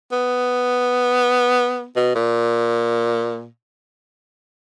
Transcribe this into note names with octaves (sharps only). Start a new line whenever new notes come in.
B3
B2
A#2